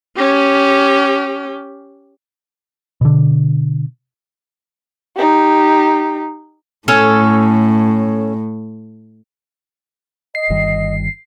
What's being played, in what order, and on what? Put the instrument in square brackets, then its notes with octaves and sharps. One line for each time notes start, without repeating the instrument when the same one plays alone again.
[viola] C#4 G4
[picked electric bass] B2 D3
[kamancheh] D#4 G4
[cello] A2 [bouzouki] C#4 A4 C#5
[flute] D#5 [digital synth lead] C7
[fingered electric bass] G1 D#3 G3